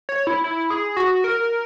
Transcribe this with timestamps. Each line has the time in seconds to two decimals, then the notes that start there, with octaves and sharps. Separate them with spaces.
0.09 C#5
0.27 E4
0.44 E4
0.70 G#4
0.97 F#4
1.24 A#4